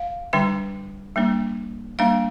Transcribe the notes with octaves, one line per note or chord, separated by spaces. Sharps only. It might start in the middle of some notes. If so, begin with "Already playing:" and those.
Already playing: F5
D3 G3 D4 G5
G3 A#3 D4
G3 A#3 D4 F5